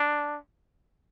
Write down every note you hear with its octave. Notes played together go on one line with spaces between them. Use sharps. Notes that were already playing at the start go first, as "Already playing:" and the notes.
Already playing: D4